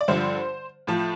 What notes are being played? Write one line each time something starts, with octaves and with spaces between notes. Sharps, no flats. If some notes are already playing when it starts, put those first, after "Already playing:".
D5
G2 D3 F3 C5
A2 F3 A5